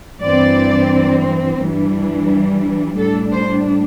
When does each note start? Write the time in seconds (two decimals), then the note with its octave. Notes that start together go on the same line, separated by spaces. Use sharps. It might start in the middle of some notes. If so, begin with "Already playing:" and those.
0.22 G2 E3 C4 D5
1.60 G2 E3 G3 D4
2.98 A2 G3 D4 A4
3.32 C5